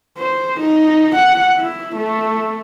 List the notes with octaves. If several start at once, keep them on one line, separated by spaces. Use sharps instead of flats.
C5
D#4
F#5
E4
A3